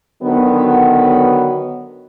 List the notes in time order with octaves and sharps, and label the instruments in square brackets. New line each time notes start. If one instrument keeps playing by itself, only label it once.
[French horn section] D3 D#3 F#3 B3